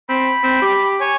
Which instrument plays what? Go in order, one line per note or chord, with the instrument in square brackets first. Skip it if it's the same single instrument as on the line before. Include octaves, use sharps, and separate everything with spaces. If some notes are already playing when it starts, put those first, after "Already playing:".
[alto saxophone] C4 [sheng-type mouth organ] B5
[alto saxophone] C4
G4
[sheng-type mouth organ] C#5 G#5